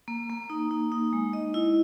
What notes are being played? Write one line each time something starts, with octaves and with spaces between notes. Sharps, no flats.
A#3
A#3
D#4
D#4
D#4
G#3
D#5
E4